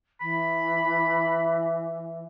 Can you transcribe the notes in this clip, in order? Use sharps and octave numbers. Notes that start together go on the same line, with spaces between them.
E3 B5